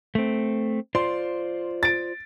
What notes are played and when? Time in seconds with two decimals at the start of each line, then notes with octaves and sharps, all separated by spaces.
0.15 A3 C4
0.95 F4 C5 D5 C6
1.83 A6 D7